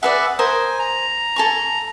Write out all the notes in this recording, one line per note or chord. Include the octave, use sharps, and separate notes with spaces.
G#4 B4 D5 E5 F#5
A#4 C5 G#5 D#6
A#5
A4 G#5 C#6